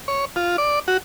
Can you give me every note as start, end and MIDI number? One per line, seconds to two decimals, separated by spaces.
0.08 0.25 73
0.36 0.57 65
0.58 0.79 74
0.88 0.97 66